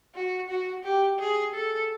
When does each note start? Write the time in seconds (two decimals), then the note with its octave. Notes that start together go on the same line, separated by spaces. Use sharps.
0.15 F#4
0.49 F#4
0.84 G4
1.19 G#4
1.54 A4